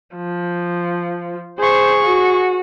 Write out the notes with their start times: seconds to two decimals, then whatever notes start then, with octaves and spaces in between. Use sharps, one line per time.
0.16 F3
1.59 G#4 C5 C#6
2.02 F#4